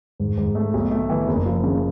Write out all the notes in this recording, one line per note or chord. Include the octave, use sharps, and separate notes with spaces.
G#2
G#2
A3
B1
A3
E3
F#1
F3
C#3